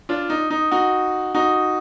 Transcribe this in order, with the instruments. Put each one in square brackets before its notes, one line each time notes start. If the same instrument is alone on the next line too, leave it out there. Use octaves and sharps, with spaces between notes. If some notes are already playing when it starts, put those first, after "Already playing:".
[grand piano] D4 F4
D#4
D#4
D#4 F#4
D#4 F#4